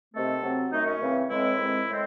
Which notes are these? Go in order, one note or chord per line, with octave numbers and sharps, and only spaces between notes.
C3 D#3 A3 C4 A4
C3 F#3 C4
F#2 D#3 A3 D#4
C#4
C#3 E3 C4
A2 E3 G#3 C4 E4
G#2 D#3 G#3 C4
A2 G#3 C4